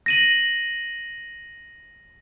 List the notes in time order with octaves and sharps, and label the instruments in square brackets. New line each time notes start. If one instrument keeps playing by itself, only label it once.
[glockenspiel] A#6 D#7 F#7